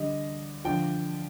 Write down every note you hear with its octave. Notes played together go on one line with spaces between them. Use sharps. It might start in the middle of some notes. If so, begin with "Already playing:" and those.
Already playing: D3 G3 D#5
D3 F3 G5